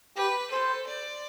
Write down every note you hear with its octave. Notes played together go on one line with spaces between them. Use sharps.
G4 B4
A4 C5
D5